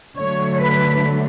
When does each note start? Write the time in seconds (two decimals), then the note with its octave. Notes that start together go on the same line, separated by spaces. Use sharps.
0.17 D3 F#3 A3 C#5
0.60 B4